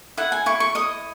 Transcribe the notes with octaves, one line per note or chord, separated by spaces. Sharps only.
E4 F#5
G#5
E4 C#6
C#6
D#5 D#6